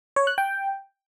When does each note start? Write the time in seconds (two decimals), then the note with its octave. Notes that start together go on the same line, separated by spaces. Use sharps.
0.16 C#5
0.27 F#6
0.38 G5